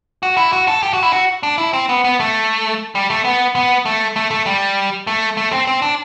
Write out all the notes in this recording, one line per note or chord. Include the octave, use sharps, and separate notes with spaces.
F#4
E4
F#4
A4
G4
F#4
E4
F#4
D4
E4
C4
B3
B3
A3
G3
A3
B3
B3
A3
A3
A3
G3
A3
A3
C4
C4
D4